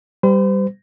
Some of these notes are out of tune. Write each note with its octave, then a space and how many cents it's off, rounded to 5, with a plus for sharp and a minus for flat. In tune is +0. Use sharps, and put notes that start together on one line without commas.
G3 +0 C5 -40